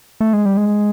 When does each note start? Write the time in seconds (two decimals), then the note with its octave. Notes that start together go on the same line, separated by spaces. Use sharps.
0.20 A3
0.33 G#3
0.46 G3
0.57 G#3